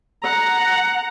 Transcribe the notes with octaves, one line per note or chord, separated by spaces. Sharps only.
F#5 A#5